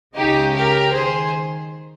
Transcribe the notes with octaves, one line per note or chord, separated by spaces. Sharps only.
C#2 C#3 D#4 G4
G4 A#4
D#3 G#4 C5